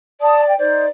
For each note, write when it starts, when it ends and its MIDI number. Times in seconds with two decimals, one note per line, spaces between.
0.21 0.57 74
0.21 0.41 81
0.21 0.41 87
0.46 0.57 79
0.58 0.84 63
0.58 0.84 72
0.58 0.88 74